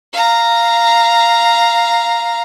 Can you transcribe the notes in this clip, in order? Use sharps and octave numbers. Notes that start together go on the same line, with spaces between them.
F5 A#5